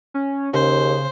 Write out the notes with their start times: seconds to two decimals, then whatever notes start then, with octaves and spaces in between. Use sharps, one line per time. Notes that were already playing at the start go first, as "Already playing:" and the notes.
0.14 C#4
0.54 D#2 C#3 C5